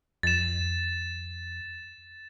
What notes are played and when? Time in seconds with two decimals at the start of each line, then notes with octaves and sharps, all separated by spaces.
0.23 F2 A6 E7